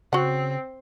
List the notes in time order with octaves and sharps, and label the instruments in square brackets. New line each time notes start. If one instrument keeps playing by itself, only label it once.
[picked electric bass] C#3 [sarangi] C4 [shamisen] F#4 F#5